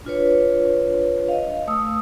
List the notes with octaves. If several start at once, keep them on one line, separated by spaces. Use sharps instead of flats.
D4 F4 B4 C#5
D#5 F5
A3 D#6 E6